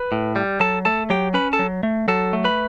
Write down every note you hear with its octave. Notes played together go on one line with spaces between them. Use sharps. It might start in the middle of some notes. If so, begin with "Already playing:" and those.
Already playing: B4 B5
A2
G3
F#3 A4 A5
A3 A4 A5
F#3 G4 G5
C#4 B4 B5
A4 A5
F#3
A3
F#3 A4 A5
A3
B4 B5